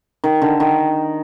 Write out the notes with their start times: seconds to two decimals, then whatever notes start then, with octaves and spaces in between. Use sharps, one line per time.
0.24 D#3
0.42 D3
0.60 D#3